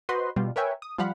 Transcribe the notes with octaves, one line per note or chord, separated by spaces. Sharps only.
F#4 B4 C5 D#5 C6
B2 G3 F4
A#4 B4 C#5 E5 G5 G#5
D#6
F3 G3 F5 F#5 B5